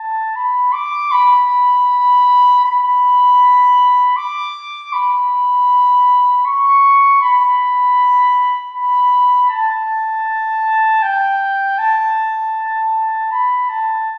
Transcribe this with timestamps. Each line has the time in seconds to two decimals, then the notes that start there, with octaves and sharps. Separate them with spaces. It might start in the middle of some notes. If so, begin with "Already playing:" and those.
Already playing: A5
0.36 B5
0.73 D6
1.11 B5
2.64 B5
4.16 D6
4.93 B5
6.45 C#6
7.22 B5
8.74 B5
9.50 A5
11.03 G5
11.79 A5
13.32 B5
13.70 A5